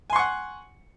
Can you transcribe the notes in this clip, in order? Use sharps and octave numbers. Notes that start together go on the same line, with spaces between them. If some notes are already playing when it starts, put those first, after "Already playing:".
F#5 G#5 C6 C#6